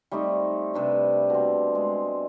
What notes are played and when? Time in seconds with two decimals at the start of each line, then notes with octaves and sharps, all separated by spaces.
0.11 G3 A3 C4 D#4
0.74 C3 D4 B4 E5
1.30 B2 C4
1.75 G#3